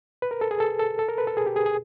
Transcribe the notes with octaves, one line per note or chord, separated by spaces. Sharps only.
B4
A#4
A4
G#4
A4
A4
A4
A#4
B4
A4
G#4
G4
G#4
G#4